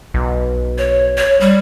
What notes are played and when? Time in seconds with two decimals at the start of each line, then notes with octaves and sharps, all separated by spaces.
0.14 B1
0.78 C#5
1.17 C#5
1.41 G3